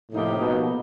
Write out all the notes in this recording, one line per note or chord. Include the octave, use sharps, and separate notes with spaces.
A2 C3 F3 A#3 D#4 G4
B2